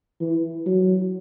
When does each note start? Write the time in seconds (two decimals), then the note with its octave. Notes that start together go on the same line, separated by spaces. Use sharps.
0.20 E3
0.66 F#3